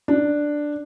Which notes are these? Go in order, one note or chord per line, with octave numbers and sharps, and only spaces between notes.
D4